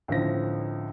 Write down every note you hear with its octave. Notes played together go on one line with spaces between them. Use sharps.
C#2 A2 D3 F3 C4 A#6